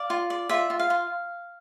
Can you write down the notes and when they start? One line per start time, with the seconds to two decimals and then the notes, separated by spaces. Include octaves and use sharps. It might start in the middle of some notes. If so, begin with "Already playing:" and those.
Already playing: D5 F5
0.10 F4
0.30 D5
0.49 F4 E5
0.70 F4
0.79 F5
0.90 F4